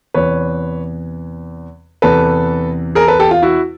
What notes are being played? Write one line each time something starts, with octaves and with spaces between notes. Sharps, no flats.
E2 C3 E3 B4 C#5
E2 C3 E3 A4 B4
G#4 A#4
A4 B4
G4 A4
F4
E4 F#4